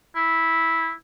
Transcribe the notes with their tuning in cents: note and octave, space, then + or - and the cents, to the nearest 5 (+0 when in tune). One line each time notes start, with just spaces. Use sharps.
E4 -10